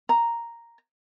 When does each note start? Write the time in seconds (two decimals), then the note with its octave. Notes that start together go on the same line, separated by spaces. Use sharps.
0.09 A#5